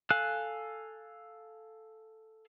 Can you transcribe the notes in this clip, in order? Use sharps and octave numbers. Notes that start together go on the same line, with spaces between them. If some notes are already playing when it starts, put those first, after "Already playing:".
A4 F5 G#5 F#6